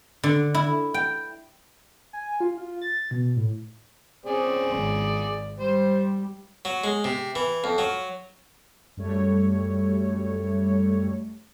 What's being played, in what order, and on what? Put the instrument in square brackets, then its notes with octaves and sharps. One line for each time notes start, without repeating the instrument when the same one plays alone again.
[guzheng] D3
E4
G5
[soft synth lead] G#5
F4
F4
A6
B2
A2
[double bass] C4 C#4 [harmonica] G#4 D5
[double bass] G#1
[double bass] G3 [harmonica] C5
[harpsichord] F#3
G#3
C3
E3
F2
F#3
[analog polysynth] F#2 G3 A3 C#5